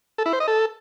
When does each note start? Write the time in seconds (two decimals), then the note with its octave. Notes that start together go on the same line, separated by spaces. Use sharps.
0.18 A4
0.26 E4
0.33 C5
0.40 D#5
0.48 A4